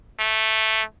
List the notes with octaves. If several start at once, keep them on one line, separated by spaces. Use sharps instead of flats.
A3